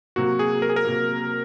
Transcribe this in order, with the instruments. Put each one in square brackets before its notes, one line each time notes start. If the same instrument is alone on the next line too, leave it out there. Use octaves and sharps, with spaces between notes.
[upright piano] C3 F#3 A#3 [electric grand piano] F#4
[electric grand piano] G#4
A#4
G#4
A#4
[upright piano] C3 F#3 A#3